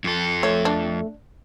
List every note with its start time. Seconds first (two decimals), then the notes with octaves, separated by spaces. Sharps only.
0.04 F2 A4
0.43 A3 C#5
0.65 D4